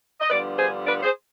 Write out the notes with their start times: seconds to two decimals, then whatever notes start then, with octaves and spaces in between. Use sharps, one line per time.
0.20 D#5
0.29 G2 D3 F3 B3 B4 D5
0.57 G#4 C5
0.85 B4 D5
1.03 G#4 C5